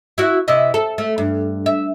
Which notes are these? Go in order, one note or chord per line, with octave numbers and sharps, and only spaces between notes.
E4 F#4
C3 E4 D#5
A4
A3
G2
E5